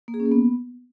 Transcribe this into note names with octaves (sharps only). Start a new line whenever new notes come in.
A#3
G#4
C#4
A#3
B3